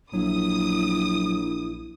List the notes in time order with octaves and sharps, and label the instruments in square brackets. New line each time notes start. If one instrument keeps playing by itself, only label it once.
[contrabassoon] A#1 [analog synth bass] F#3 [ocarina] E4 [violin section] D#6